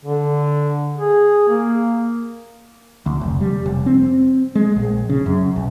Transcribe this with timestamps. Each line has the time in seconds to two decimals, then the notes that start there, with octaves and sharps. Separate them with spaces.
0.05 D3
0.98 G#4
1.48 A#3
3.06 D2
3.21 F1
3.41 G3
3.66 F1
3.86 C4
4.55 G#3
4.76 A#1
5.09 C#3
5.26 F#2
5.56 B1